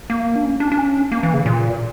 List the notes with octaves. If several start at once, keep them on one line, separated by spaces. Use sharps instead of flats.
A#3
D4
C#4
D4
D4
C#4
A#3
E3
C#3
A#2